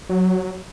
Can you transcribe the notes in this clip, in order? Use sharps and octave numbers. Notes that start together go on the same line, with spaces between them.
F#3